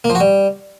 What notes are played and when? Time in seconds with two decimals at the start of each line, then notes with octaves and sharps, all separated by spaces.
0.04 A#3
0.10 F3
0.15 F#4
0.20 G3